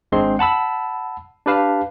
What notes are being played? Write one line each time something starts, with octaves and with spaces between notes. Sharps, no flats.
G#1 G#3 C4 D4 C6
F#5 A5 B5 E6
D4 G4 B4 F5 A5